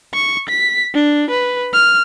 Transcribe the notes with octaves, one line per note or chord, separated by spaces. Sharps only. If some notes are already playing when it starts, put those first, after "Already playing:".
C#6
B6
D4
B4
F6